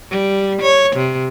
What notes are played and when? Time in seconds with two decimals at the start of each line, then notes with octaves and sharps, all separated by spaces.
0.11 G3
0.62 C#5
0.96 C3